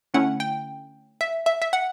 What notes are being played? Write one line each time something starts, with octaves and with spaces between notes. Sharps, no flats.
D3 A3 C#4 E4 F#5
G5
E5
E5
E5
F#5